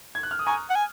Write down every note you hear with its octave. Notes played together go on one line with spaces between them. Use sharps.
G#6
F#6
F6
D#6
G#5 A#5 C#6
F#5
G#5